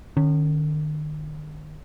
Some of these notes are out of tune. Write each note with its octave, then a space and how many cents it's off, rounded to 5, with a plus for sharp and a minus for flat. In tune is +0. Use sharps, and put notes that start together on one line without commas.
D#3 -40 C#4 +0